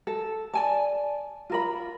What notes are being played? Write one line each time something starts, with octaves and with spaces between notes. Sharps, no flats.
A4
D5 G#5 A5
F4 A#4 B5